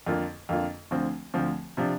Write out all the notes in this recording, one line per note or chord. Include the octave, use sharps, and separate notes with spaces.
F2 D3 A#3 F4
F2 D3 A#3 F4
D2 D3 F3 C4
D2 D3 F3 C4
C3 F3 D4